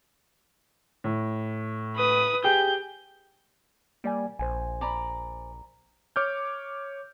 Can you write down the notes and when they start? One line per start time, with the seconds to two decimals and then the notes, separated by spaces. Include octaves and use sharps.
1.04 A2
1.96 B4 D#6
2.44 G4 G#4 G5 G6
4.04 G3 A#3 D5 G#5
4.39 A#1 C5 G#5
4.81 D5 A#5 B5
6.16 C#5 D6 F6 G6